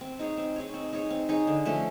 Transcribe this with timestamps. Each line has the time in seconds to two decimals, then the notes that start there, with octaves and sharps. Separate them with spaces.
0.01 C4
0.19 D#4 G#4 C#5
0.37 C4
0.56 D#4 G#4 C#5
0.74 C4
0.93 D#4 G#4 C#5
1.10 C4
1.29 D#4 G#4 C#5
1.47 D3
1.65 F3 A3 C#4